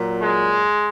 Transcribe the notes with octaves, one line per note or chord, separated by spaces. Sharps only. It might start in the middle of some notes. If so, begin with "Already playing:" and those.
Already playing: A#2 F#3
G#3